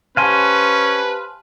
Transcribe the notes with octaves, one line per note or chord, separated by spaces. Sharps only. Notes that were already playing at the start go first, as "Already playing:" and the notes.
C#4 G4 B4 C5 F5 G#5 A5 C6